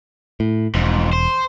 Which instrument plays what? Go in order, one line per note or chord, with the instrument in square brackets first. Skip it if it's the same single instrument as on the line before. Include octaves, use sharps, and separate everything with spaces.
[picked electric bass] A2
[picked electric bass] E1 [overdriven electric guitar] F2 G#2
[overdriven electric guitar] C5